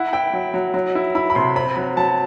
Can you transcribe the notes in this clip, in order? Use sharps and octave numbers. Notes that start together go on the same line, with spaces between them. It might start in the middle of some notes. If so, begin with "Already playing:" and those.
Already playing: E4 F#5
E4 G5
F#3
F#3
F#3
E4
E4 B5
B5
C3 C6
C4 B5
F#3 B5
F#3 A5